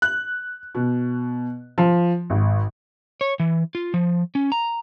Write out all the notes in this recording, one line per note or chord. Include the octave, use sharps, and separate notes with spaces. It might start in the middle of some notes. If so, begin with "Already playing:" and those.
F#6
B2
F3
G#1
C#5
E3
F4
F3
C#4
A#5